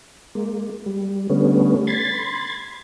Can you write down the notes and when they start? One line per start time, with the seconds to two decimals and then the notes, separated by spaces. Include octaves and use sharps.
0.35 G#3 A#3
0.86 G3
1.30 D3 G3 A3 B3 C#4
1.87 B5 C6 G#6 A6